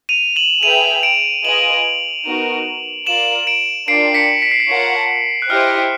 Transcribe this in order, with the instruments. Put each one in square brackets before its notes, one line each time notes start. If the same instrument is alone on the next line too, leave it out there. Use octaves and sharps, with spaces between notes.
[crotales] D#7 F7
E7 F#7
[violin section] G#4 B4 E5 G5 [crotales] D#7 F7
[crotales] D7 E7
[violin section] F4 G#4 B4 D#5 G#5 [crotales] E7 F#7
[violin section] B3 D#4 F#4 A#4
[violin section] F4 A#4 D5 F5 [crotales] E7 F#7
[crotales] D7 E7
[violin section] D4 F4 A#4 D5 G5 [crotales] C7 D7
[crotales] B6 C#7
B6
C7
B6
[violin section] F4 A#4 C#5 F#5 A5
[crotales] F#6
[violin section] E4 G4 C5 D#5 G5 [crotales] F6